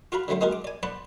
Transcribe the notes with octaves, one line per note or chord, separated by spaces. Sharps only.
F4 F#4 F5 A#5 B5
D3 F#3 A3 C4 C5
G#3 A#3 D#4 F#4 G4 A#4
D6
D5 G#5
C5 D5 F#5 A5 B5